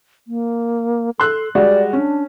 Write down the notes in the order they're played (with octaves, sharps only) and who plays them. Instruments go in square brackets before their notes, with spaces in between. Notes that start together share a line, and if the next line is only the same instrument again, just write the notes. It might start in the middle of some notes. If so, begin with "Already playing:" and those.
[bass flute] A#3
[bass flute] A4 [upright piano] C6 E6 F#6
[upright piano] G3 G#3 F#4 [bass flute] D5
[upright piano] C#4 [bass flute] D4